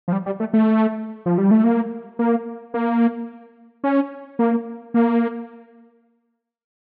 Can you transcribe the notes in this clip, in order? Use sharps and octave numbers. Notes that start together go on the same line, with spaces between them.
F3
G3
G3
A3
A3
F3
G3
A3
A#3
A#3
A#3
C#4
A#3
A#3